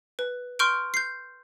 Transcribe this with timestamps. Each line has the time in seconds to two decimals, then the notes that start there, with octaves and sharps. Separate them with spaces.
0.19 B4
0.59 C6 C#6 F6 G6 D7
0.94 G6 C7